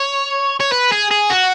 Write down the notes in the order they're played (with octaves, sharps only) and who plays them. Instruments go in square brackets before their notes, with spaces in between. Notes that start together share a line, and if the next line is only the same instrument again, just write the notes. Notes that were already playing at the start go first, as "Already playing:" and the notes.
Already playing: [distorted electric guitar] C#5
C#5
B4
G#4
G#4
F#4